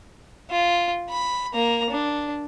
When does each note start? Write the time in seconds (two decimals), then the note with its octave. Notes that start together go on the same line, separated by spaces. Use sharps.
0.50 F4
1.09 B5
1.54 A#3 A#5
1.90 D4